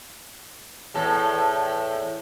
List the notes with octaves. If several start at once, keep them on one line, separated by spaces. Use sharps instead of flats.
E2 A2 A4